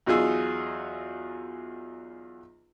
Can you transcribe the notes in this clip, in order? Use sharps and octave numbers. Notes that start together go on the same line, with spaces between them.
E2 F#3 D#4 F4 G#4 E6